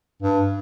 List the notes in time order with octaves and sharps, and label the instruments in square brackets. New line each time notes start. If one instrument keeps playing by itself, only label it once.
[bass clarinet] G2